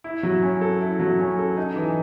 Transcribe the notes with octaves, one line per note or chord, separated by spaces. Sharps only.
E4
F#3
C#4
A4
E4
F#3
C#4
A4
D#4
E3